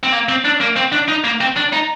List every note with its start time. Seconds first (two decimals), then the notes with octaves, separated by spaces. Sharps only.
0.03 C4
0.12 A#3
0.29 C4
0.45 D4
0.61 A#3
0.77 C4
0.93 D4
1.09 D#4
1.25 A#3
1.41 C4
1.56 D4
1.73 D#4